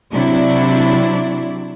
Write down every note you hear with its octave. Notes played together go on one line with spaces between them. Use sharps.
C3 F#3 D4 E4